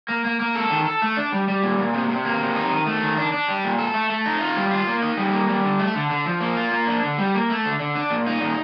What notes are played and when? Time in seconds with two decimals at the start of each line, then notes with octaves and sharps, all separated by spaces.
0.08 A#3
0.25 A#3
0.40 A#3
0.55 A4
0.70 D#3
0.86 A4
1.02 A3
1.17 D4
1.32 G3
1.48 G3
1.63 A#2
1.78 A#2
1.94 C3
2.09 C3
2.25 A#3
2.40 C3
2.55 D#4
2.71 D#3
2.86 A3
3.01 D#3
3.17 D4
3.33 D4
3.48 G3
3.64 A#2
3.79 A4
3.94 A3
4.10 A3
4.26 D#4
4.40 F4
4.56 G3
4.71 F4
4.87 A#3
5.02 D#4
5.17 G3
5.33 A#3
5.49 G3
5.64 D3
5.79 A3
5.95 D3
6.10 D3
6.26 F3
6.40 A#3
6.57 F4
6.72 A#3
6.87 D4
7.03 D3
7.18 G3
7.34 A#3
7.50 A3
7.65 D3
7.80 D3
7.95 D4
8.10 A#2
8.27 D#4
8.41 A#2